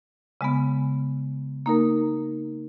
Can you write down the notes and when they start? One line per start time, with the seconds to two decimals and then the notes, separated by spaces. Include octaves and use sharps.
0.41 C#3 G#3 B3
1.66 A#3 D#4 A#4